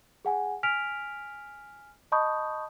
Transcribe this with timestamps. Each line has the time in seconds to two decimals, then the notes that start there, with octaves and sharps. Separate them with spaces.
0.25 G#4 F#5 G#5
0.63 G#5 F6 B6 D7 F7
2.12 D#5 A5 B5 C#6 D#6 G6